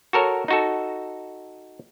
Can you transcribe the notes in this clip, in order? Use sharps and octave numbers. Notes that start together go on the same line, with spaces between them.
F#4 A4 A#4 C#5
D#4 F#4 A4